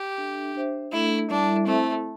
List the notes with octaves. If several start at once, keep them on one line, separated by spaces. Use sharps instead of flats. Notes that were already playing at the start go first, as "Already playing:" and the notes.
Already playing: G4
D4 A4 E5
D4 C5 E5
A3 D4 E4 A4
G3 D4 E4 A4 E5
A3 C4 E4 A4 C5 E5